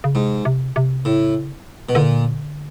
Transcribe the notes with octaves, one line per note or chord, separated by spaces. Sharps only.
C#3
G#2 C3
C3
C3
A2 C#3
B2
A#2 D3